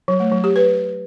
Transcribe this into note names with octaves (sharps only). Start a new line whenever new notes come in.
F#3
A3
F#3
G4
B4